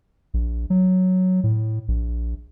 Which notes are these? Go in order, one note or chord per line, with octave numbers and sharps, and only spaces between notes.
A#1
F#3
A2
A#1